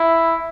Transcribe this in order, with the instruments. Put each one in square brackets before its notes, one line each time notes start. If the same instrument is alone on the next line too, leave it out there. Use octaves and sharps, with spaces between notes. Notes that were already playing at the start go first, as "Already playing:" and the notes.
Already playing: [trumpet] E4